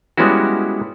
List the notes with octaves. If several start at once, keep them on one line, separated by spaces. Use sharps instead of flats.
G3 G#3 B3 C#4 E4 F#4